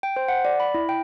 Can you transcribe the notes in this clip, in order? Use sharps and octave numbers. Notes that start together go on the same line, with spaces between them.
G5
C5
F#5
D5
B5
E4
G5